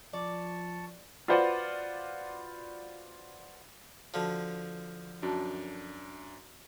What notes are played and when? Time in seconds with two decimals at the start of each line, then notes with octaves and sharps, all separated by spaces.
0.13 F3 D5 A5 C#6
1.28 F4 F#4 B4 C5 D5 F#5
4.14 D3 F3 F#4 A5
5.22 F#2 D4 F#4 A5